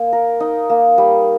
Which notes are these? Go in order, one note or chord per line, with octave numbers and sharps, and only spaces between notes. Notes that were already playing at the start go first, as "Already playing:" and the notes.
Already playing: A#3 D#4
A#4
D#4
A#3
G3